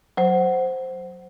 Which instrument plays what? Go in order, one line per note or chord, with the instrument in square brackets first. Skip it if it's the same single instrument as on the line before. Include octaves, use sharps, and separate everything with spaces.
[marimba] F#3 C5